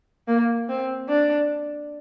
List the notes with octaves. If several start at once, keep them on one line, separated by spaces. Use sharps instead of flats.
A#3
C4
D4